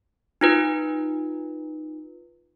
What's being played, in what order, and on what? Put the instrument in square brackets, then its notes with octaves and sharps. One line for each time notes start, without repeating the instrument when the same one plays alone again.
[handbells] D#4 F4 B4